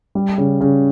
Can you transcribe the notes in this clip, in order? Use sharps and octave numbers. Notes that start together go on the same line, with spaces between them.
G3
C#3
C#3